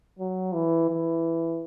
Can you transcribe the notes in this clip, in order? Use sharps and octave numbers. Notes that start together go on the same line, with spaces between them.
F#3
E3
E3